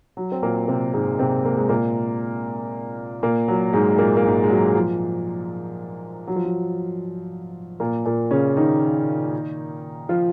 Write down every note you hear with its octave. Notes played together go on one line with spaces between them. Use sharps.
F#3
C4
A#2 A#3
C3 C4
G#2 G#3
C3 C4
A#3
G#3
A#2 A#3
A#2 A#3
F#3
G#2 G#3
A#2 A#3
A#3
G#2 G#3
G#3
F#3
F3
F#3
F3
F#3
A#2 A#3
A#2 A#3
C#3 C#4
D#3 D#4
F3 F4